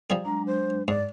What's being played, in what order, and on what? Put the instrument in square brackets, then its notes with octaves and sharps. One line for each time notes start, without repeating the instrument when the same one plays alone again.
[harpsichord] F3 G3 G#4
[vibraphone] F#3 G#3 D4 [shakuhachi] A#5
[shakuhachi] C5
[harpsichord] G#2 [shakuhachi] D5